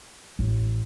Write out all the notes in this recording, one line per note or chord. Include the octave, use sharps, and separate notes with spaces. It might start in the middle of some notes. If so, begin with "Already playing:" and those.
A1